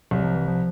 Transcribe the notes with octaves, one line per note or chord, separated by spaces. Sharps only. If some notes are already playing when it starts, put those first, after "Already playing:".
C2 F#3
F3
E3
F3